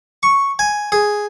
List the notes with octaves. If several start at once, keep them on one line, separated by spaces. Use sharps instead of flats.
C#6
G#5
G#4